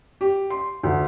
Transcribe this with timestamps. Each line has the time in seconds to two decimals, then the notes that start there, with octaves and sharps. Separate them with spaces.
0.21 G4
0.50 C6
0.83 D2